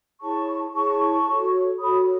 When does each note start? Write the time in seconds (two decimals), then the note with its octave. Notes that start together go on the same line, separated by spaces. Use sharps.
0.21 E4 G#4 C#5 A5 C#6
0.74 E4 G#4 C#5 A5 C#6
1.27 F#4 A4 C#5
1.80 F#4 A4 C#5 B5 D#6